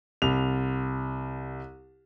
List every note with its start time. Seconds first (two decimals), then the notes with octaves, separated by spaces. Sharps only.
0.22 C2 F7